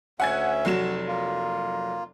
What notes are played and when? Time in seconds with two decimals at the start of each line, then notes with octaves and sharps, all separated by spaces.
0.20 D2 C#4 E5 F#5 G#5 G#6
0.65 F1 F#3 F#4 E7
1.08 A#3 F4